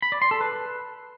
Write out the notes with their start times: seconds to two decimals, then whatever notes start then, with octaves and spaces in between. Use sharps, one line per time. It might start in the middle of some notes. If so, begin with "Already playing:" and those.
0.02 B5
0.12 D5
0.22 C6
0.31 A4
0.41 B4